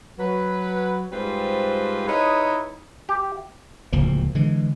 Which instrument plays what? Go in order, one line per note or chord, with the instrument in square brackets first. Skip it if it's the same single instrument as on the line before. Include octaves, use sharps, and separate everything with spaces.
[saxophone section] F#3 B4
G#2 G3 C4 F4 B4 C5
D#4 E4 G#4 B4 C#5 D#5
[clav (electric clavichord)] G4
[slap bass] D1 C#2 F3 A#3
D3 E3 G#3